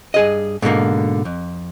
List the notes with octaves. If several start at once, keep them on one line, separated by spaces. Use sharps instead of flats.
G2 G#4 D#5
G#2 B2 D3 A#3
F2